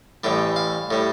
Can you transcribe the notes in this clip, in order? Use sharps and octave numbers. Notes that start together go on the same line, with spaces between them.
A1 A2 G3 G5
F5
A2 G3